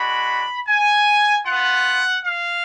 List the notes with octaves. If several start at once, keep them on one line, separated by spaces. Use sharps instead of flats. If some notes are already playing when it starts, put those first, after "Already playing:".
Already playing: G#3 D4 F#4 B5
G#5
B3 F4 F#5
F5